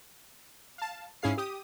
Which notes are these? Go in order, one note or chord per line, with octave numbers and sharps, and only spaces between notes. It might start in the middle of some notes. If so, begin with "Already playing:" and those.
F5 A5
G#2 C#4 E4 G#4 F5 C7
G4 D#6